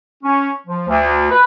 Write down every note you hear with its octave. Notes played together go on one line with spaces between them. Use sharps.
C#4
F3
D2
B4